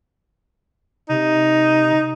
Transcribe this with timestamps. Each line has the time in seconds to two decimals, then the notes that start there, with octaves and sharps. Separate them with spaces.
1.09 C3 D#4